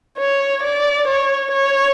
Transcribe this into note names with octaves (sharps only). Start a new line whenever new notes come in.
C#5
D5
C#5
C#5